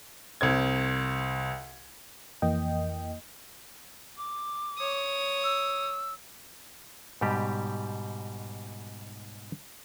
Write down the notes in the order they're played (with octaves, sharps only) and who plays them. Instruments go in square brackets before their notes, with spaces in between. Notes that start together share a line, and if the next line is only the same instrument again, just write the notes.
[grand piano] C2 C4 G#6
[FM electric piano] F2 E3 A#3 D#5 G5
[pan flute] D6
[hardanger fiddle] C#5 D#6
[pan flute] E6
[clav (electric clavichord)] G#2 B2 G3 G4